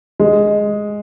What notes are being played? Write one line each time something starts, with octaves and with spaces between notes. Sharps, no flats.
G#3